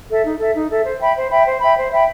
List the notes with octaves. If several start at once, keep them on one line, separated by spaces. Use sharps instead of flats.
A4 E5
D#4
A4 E5
D#4
A4 E5
C5
E5 G5 B5
C5
E5 G5 B5
C5
E5 G5 B5
C5
E5 G5 B5